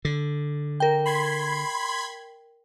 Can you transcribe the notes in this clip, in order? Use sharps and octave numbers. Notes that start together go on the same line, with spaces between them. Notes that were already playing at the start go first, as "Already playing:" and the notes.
D3
A#4 G5
B5 C6 G#6